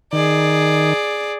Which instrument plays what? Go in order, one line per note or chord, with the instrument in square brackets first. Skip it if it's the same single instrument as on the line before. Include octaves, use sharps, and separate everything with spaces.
[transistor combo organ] D#3 [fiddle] G#4 D5